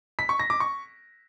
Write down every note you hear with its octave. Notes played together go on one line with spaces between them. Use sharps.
B6
C#6
A#6
D6
C#6